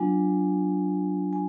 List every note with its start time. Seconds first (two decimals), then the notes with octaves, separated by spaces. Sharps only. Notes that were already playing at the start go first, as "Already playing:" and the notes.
Already playing: F#3 B3 D4 F4 G#5
1.33 G#5